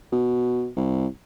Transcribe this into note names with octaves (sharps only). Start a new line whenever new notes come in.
B2
C2